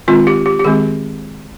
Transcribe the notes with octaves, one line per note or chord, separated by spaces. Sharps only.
D#3 G#3 C4 F4
G4
G4
G4
D#3 G#3 C4 G#4